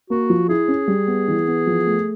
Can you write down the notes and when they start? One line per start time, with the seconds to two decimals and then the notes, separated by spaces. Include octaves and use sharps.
0.10 A#3 F#4
0.30 F3
0.49 E4 G#4
0.68 C#4
0.88 G3
1.07 B3
1.28 E3
1.47 B3
1.67 F3
1.87 A3